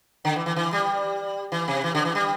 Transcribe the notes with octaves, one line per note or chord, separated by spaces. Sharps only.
D3
E3
E3
E3
G3
E3
C3
E3
D3
E3
G3